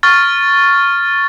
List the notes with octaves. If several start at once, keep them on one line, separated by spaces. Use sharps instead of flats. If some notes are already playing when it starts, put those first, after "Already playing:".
C#6 F6 A6